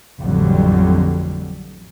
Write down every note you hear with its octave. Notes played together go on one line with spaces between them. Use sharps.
A1 F2 D3 F#3 G3